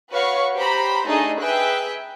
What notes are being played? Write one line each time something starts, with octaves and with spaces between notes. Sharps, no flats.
F#4 B4 C#5 F5 C#6
G4 C5 A#5 B5
A3 D4 D#4 G#4 D#5
G#4 B4 E5 G5 F#6